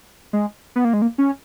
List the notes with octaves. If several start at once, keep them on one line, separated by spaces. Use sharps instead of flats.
G#3
B3
A#3
G#3
A#3
C#4